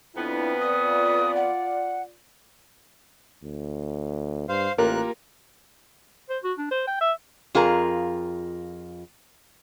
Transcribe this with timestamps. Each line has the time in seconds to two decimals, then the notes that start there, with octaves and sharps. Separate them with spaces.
0.16 F2 B3 D4 E4
0.61 F4 D5 D#6
1.36 F#5
3.44 D2
4.49 G2 C5 F5
4.78 A1 A#3 F4 G4 A#4 F#6
6.30 C5
6.44 F#4
6.58 D4
6.71 C5
6.87 G5
7.01 E5
7.55 F2 F4 G#4 A#4 A#5